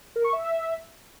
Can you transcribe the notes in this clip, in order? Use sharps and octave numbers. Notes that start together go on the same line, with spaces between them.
A#4
C#6
E5